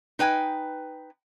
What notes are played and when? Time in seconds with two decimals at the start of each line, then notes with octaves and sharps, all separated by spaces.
0.19 D#4 B4 G5 G#5